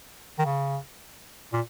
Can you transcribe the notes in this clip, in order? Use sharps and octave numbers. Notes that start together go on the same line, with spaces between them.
D#3
C#3
A#2